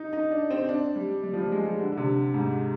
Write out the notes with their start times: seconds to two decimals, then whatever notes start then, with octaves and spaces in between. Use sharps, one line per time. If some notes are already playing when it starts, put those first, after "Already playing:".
Already playing: D#4
0.13 D#4
0.31 D4
0.51 C4
0.69 D4
0.96 G3
1.24 G3
1.33 F3
1.38 G3
1.52 G#3
1.65 G3
1.79 D3
1.92 D3
1.97 C3
2.34 G#2